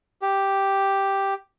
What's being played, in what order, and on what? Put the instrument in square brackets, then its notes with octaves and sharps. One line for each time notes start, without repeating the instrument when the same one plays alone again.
[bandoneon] G4